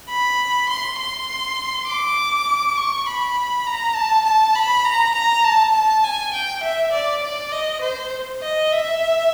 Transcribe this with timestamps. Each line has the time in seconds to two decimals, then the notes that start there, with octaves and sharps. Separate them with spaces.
0.09 B5
0.69 C6
0.99 C6
1.87 D6
2.77 C#6
3.06 B5
3.67 A#5
3.95 A5
4.25 A5
4.55 B5
4.84 A#5
5.14 A#5
5.44 A5
5.74 A5
6.04 G#5
6.33 G5
6.63 E5
6.92 D5
7.23 D5
7.52 D#5
7.81 C5
8.41 D#5
8.71 E5